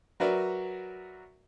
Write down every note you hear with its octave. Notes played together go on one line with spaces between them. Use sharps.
F#3 F#4 A#4 B4 D5 E5